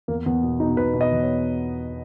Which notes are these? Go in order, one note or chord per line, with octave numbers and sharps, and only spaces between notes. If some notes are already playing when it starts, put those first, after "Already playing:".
E2 A#3
E2 B3
B2
B2 D#4
B2 B4
B2
D#5
E2
C#5